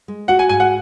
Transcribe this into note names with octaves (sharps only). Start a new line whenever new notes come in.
G#3
F#4 F#5
G#5
G#2 G#5
F#5